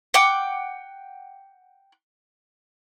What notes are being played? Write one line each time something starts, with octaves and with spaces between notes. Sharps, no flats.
F#5 G5 D6